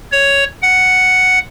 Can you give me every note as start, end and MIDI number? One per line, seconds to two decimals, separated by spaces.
0.12 0.44 73
0.62 1.39 78